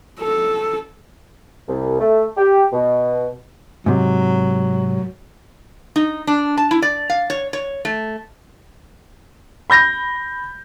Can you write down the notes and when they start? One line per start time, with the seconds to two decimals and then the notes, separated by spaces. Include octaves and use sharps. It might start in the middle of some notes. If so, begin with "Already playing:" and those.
0.20 A4
1.69 C2
2.00 A3
2.37 G4
2.72 B2
3.86 G#2 C3 F#3
5.96 D#4
6.27 D4
6.57 A5
6.71 E4
6.82 D5
7.10 F5
7.30 C#5
7.53 C#5
7.85 A3
9.70 B5 G6 A#6